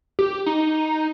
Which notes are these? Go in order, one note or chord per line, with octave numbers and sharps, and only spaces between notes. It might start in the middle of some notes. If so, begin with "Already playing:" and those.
G4
D#4